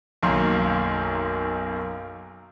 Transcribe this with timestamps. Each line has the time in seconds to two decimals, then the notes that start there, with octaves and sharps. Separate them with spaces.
0.23 B1 F#2 D#3 A#3 C6